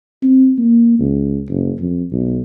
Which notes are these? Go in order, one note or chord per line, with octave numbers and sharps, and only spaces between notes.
C4
A#3
C#2
F#1
F2
B1